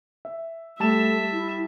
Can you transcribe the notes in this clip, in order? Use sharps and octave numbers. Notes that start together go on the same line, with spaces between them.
E5
G3 A3 E5 A5 E7
E4